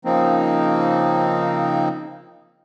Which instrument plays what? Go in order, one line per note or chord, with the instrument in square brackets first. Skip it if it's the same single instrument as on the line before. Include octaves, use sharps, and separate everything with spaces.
[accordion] C#3 F3 A#3 C4 D#4